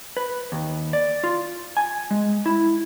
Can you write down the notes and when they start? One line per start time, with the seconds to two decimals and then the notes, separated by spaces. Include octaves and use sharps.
0.17 B4
0.52 D#2
0.93 D5
1.24 F4
1.77 G#5
2.11 G#3
2.46 E4